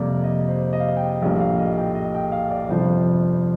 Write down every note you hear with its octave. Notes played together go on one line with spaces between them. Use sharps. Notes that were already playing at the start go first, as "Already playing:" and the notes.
Already playing: F2 C3 G3 A#3 D5
D#5
C5
D#5
F5
D#5
G5
A#1 A2 G3 A#3 F5
F5
D#5
G5
D#5
G5
F5
D5
G1 F2 C3 F3 C5